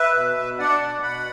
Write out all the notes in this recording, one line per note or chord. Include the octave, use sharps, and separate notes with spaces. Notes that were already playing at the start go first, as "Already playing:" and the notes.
Already playing: B4 E5
B2
B2
D4 D5 F#5
B2
B2 F#5 B5